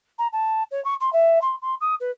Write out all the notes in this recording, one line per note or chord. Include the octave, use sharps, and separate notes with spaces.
A#5
A5
C#5
C#6
C6
E5
C6
C6
D#6
B4